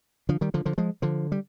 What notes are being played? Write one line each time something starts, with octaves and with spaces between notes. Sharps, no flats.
D3 F3
D#3 G3
D3 F3
D3 F3
F3 G#3
D3 F3
G3